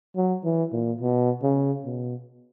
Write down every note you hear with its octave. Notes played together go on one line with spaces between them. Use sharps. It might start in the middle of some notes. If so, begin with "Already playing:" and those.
F#3
E3
A#2
B2
C#3
B2